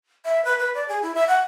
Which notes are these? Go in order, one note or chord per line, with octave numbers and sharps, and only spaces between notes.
E5
B4
B4
D5
G#4
E4
E5
F#5